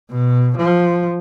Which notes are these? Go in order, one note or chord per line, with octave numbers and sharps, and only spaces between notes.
B2
F3